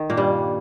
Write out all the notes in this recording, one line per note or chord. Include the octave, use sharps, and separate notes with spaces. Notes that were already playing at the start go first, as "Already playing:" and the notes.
Already playing: D#3
A#2 A#3
G2 G3